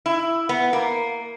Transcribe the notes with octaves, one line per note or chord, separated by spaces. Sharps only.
E4
B3
A#3